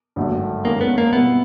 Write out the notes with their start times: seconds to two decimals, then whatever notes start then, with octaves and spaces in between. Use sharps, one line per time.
0.16 G#1 G2 D3 F#3 A3
0.64 D#2 D#3 G#3 A#3 C#4
0.81 B3
0.98 A#3
1.13 B2 G3 B3 C4 E4